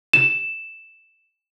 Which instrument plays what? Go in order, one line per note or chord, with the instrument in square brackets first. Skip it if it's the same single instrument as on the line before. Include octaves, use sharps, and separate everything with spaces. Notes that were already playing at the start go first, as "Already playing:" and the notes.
[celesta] E7